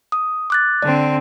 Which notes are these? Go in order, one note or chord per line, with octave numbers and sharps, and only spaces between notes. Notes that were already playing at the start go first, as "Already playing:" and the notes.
D#6
D6 F#6 A6
D3 C4 D5